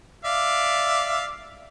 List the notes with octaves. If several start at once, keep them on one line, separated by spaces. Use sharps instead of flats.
D5 E5 F5